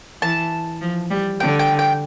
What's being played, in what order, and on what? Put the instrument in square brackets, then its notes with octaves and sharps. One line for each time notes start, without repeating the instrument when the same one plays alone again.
[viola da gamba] E3 [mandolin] A5
[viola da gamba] F3
G3
[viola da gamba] D3 [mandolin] G5
[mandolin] G5
G5